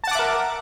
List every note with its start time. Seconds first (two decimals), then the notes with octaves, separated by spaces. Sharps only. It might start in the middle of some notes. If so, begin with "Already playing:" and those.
0.04 A5
0.07 F#5
0.11 D6
0.15 E5
0.19 A#4